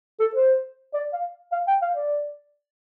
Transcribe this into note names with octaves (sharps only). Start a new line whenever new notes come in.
A4
C5
D5
F5
F5
G5
F5
D5